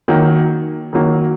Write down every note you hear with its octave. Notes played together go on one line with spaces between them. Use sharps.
D#3 F#3 A#3
D#3 F#3 A#3